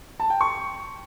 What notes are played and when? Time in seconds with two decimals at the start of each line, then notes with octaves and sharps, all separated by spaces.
0.20 A5
0.30 G5
0.41 C#6